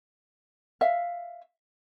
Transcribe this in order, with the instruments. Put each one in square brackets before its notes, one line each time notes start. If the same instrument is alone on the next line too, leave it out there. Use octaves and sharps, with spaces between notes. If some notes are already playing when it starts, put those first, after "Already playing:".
[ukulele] E5 F5